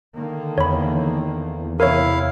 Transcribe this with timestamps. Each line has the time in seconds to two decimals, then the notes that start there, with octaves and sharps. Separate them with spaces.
0.16 D3 D#3 A#3
0.58 E2 C#5 B5
1.80 C3 E4 A#4 C#5 F5